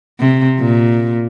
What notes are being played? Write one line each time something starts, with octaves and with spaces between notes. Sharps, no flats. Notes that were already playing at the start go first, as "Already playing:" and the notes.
C3
A#2